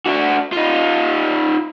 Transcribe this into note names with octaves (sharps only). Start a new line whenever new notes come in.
D4 F#4
D#4 F4